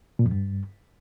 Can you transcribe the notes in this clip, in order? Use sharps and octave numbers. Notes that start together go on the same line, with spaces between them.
A#2
F2
G2